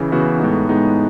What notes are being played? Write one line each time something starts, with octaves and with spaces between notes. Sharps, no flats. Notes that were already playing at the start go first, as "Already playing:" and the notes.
Already playing: C#3 E3
C#3 E3 B3 F#4
A2 G#3 B3 D#4
A2 G#3 B3 D#4